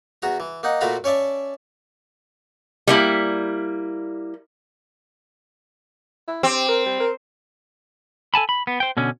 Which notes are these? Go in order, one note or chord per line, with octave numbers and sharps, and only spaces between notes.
E2 F#4 A#5
E3
A#3 D#4 F#5
A#2 A3 F#4 F5 A#5 B5
C#4 C#5 D5 E5 A5
G3 A#3 E4
E4
C4 G4
A#4
G3
A#4
A4 G#5 A5 B5
B5
B3
C5 G5
B2 D3 C#4